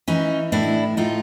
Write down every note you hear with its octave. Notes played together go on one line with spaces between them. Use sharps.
E3 C#4 D#4
A2 D4 E4
A2 D#4 F4